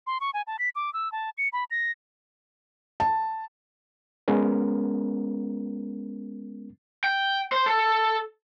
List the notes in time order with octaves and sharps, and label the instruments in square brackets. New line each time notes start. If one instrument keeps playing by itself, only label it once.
[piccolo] C6
C#6
G#5
A5
B6
D6
E6
A5
C#7
B5
A#6
[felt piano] A5
[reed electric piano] G#3 B3 C#4 A#4
[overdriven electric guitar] G5
C5
A4